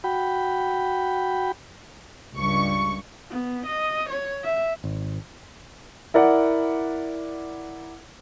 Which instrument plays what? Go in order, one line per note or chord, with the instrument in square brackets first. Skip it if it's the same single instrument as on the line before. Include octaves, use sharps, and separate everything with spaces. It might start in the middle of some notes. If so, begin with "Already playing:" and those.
[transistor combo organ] F#4 G5 B5
[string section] C#2 G2 C#6
[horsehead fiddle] B3
D#5
C#5
E5
[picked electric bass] G#1
[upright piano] E4 A#4 D5 F#5